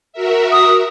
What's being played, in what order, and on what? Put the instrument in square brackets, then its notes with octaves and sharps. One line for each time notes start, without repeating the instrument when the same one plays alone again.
[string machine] F#4 A#4 E5
[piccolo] D#6